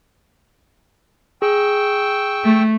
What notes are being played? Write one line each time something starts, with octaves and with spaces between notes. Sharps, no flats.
G#4 G5 C#6 E6
A3